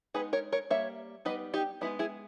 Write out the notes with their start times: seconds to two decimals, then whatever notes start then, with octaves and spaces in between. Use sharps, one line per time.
0.14 G#3 B3 D#4 G#4 B4
0.33 A#4 C#5
0.52 A#4 C#5
0.70 G3 A#3 C#5 E5
1.25 G3 B3 D#4 B4 D#5
1.54 D#4 G4
1.81 G#3 B3 D#4 E4
1.99 E4 G#4